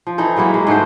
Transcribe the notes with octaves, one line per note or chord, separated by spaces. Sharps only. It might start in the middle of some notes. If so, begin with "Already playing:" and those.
F3
E3 D#4 A4
F#3 G#3 A#3 E4
G#3
G#2 A3 F#4 C5